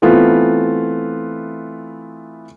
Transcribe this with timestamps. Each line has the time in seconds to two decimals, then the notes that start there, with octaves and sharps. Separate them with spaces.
0.02 E3 A3 B3 C4 F4